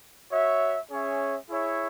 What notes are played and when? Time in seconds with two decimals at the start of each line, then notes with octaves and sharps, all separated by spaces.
0.31 F#4 C#5 E5
0.90 C#4 G#4 C#5 E5
1.48 E4 G#4 C#5 E5